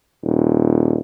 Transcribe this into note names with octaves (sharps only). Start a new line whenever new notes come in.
D#1